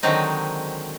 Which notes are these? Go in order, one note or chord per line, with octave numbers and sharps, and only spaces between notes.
D3 D#3 F#3 G#3 C4 D#4